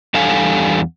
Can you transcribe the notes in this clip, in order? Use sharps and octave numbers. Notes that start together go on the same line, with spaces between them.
E2 G3 D4 A4 F5 G#5